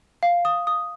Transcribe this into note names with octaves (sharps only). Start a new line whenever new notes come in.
F5
D#6
D#6